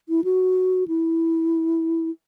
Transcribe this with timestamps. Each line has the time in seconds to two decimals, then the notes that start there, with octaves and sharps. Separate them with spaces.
0.09 E4
0.24 F#4
0.88 E4